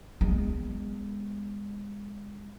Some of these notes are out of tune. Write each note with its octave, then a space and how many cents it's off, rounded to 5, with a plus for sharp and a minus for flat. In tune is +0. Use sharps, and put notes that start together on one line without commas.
G#3 -30 B3 +0